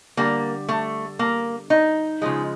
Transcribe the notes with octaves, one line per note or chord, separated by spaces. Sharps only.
D3 G3 A#3
A3
A#3
D#4
C#3 F3 G#3